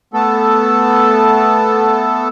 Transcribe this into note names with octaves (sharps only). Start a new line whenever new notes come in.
A3 B3 A4